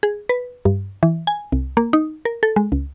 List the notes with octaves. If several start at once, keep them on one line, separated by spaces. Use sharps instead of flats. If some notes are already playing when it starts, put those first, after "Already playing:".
G#4
B4
G2
E3
G#5
C2
A#3
D#4
A#4
A4
G#3
C#2